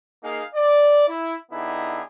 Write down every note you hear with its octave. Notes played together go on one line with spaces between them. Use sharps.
A#3 D#4 G#4 F5
D5
E4
D3 B3 D#4 E4 G4 G#4